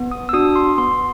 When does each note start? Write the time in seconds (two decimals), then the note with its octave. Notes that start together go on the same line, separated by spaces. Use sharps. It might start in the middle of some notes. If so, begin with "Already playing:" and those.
Already playing: B3
0.11 D#6
0.29 E6
0.33 D4 F#4 D#6
0.56 C6
0.77 B3 C6